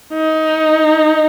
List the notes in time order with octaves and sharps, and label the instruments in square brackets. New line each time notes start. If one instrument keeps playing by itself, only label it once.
[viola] D#4